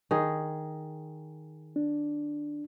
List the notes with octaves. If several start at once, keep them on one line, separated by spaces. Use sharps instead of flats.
D#3 G#4
D4